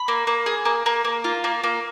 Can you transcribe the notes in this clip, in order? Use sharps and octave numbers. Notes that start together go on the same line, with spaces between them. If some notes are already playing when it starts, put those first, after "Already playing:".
Already playing: B5
A#3
A#3
G#4
A#3
A#3
A#3
F4
A#3
A#3